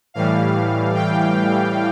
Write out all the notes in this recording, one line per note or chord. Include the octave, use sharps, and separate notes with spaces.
A2 E3 G3 F5
G5